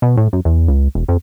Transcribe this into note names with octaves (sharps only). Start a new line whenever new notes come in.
B2
A2
F#2
E2
C#2
E1
F2